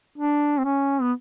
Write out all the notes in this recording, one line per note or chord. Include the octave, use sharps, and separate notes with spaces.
D4
C4
C#4
B3